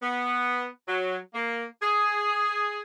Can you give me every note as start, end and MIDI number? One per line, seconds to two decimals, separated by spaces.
0.02 0.66 59
0.87 1.17 54
1.34 1.64 58
1.81 2.81 68